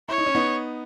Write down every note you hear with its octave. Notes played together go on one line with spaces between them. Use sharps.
E4 C#5
D#4
C#4
B3 D#4